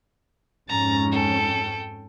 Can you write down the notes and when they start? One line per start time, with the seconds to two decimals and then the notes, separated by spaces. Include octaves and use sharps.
0.69 F2 G#2 C#4 A#5 A6
1.12 A4 G5